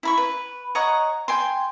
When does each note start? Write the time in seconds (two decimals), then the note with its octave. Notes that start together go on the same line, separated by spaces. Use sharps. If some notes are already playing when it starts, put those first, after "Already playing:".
0.03 E4 B5 C#6
0.18 B4
0.75 C#5 D#5 F#5 A#5
1.28 G5 G#5 C6